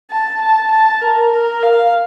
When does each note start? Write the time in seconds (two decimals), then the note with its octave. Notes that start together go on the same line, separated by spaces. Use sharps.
0.11 A5
0.41 A5
0.72 A5
1.02 A#4
1.32 A#4
1.63 F5